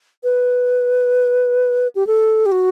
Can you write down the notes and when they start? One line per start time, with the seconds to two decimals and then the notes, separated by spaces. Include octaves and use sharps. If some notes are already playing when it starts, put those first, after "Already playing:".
0.24 B4
1.95 G4
2.07 A4
2.46 G4
2.52 F#4